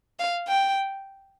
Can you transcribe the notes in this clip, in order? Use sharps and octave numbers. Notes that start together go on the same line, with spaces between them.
F5
G5